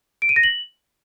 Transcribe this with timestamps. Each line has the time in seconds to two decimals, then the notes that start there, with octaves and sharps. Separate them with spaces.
0.22 D7
0.29 D#7
0.36 A#6
0.43 F#7